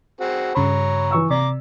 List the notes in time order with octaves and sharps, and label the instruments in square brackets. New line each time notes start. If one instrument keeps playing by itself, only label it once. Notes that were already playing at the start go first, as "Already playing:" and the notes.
[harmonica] C4 F#4 G#4
[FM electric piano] G2 C#3 B5 [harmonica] C#5 A#5
[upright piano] E3 C#6 E6
[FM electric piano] C3 [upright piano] D5 [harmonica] A#5 D6